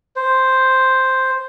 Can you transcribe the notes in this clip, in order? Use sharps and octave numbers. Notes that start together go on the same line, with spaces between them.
C5